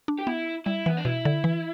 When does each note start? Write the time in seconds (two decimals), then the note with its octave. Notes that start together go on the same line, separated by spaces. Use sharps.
0.08 D4
0.19 G4
0.27 B3 E4
0.66 G3 E4
0.86 E3 B3
0.97 D4
1.05 B2 E4
1.25 D3
1.44 E3